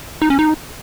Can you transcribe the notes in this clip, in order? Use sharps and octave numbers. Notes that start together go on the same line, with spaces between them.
D#4
C#4
D#4